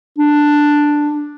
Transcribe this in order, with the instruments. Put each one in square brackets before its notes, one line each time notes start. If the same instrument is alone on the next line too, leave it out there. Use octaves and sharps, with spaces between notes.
[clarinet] D4